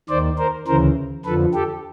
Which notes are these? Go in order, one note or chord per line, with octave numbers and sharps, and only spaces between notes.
D#2 D#3 C5 D5
A#4 C5
D2 C#3 E3 A#4 C5
F2 D3 F3 A4 B4
G4 A4